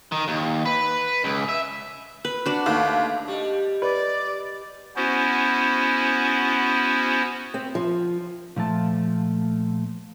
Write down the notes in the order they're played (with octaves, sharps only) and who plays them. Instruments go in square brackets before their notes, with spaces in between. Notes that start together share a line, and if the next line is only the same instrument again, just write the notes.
[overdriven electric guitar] D#3
D#2
B4
C#2
E5
[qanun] B4
D4 F#4
[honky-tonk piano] D#2 [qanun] A3
[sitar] G3 [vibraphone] G4 D#5
[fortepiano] B4 [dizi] D5
[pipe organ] B3 C#4 E4 F#4 C5
[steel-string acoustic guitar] C4
F3
[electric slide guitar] A#2 F3 A3 A5